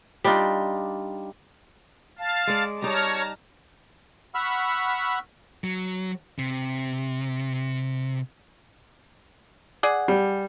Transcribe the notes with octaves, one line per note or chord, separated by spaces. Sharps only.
G3 D4 D#4 F4
F5 A5
G#3 D5
G3 D#4 C#5 A5 A#5 F6
F#5 B5 C#6 E6 F6
F#3
C3
G#4 D5 F#5
G3